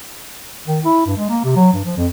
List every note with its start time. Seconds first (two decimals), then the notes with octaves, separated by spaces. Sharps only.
0.67 D#3
0.84 E4
1.06 G2
1.17 G#3
1.30 A#3
1.44 C3
1.56 F#3
1.73 G2
1.85 F3
1.97 F2